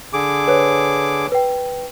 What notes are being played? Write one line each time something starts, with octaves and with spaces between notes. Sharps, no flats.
D3 G#4 D6
B4 C#5
B4 G5